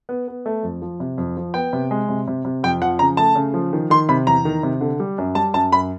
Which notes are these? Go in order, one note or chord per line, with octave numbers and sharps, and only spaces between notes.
B3
B3
A3
F2
F3
C3
F2
F3
B3 G5
C3
G#3
C3
C3
C3
F2 G5
F3 F#5
C#3 A#5
A3 A5
C#3
F3
D#3
D#3 C6
C3 B5
E2 A#5
D#3
C3
D3
G3
F#2
G3 A5
F#2 A5
F#2 B5